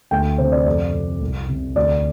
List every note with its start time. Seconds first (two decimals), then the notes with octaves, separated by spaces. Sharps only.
0.11 D2 G5
0.38 C3 C5
0.52 D5
0.66 F2 D5
0.93 C3
1.21 C2
1.49 C3
1.75 D2 D5